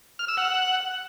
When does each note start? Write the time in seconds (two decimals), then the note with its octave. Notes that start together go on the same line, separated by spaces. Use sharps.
0.19 F6
0.28 E6
0.37 F#5